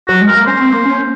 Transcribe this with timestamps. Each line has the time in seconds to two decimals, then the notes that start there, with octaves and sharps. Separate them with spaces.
0.08 F#3 F#4
0.21 G#3
0.28 A#4
0.34 A#3
0.47 C#4 C5
0.61 C4
0.73 A#3
0.86 C#4